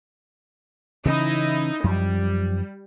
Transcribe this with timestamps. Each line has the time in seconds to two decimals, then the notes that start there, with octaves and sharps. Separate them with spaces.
1.05 C#3 E3 C#4 D#4 E4 D#5
1.84 F#2 F3 G3